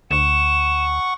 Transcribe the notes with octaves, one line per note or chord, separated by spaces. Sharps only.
D2 F#5 C#6 E7